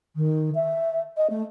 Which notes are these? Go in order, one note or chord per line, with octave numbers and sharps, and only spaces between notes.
D#3
E5
D#5
A3